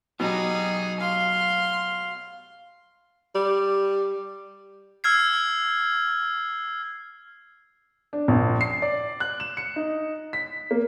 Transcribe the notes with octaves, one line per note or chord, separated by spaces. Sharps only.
B2 F#3 D#4 G4 G#4
F5 C6
G3
E6 F6 G#6 C7
D4
A#1
C7
D5
F#6
E7
C#7
D#4
B6
A#3